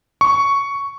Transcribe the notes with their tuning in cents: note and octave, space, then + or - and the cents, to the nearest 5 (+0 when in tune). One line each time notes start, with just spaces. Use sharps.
C#6 +5